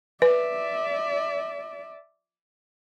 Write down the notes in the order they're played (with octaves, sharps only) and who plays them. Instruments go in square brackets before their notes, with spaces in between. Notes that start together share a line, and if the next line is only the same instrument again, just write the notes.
[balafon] B4 [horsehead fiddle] D5 E5